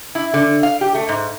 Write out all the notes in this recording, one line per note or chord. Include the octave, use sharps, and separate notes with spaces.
E4
D3
F5
G4
A3
G#2